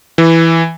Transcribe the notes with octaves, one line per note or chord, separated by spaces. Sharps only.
E3